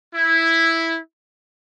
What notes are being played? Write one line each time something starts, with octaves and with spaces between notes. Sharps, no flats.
E4